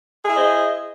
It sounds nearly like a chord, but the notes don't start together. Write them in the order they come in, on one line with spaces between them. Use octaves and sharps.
G#4 E4 D#5 C5